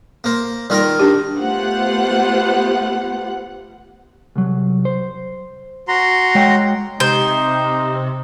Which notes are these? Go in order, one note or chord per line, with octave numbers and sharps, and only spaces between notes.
A#3 C5
D#3 G3 F4 A#4
D4 G4
A3 B3 F4 G4 C5 F#5
C2 F#3
C5
F#4 A#5 C6
G#3 C#5 G5
C3 D#4 C5